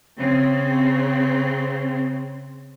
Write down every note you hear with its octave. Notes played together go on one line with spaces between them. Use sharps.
C#3 C4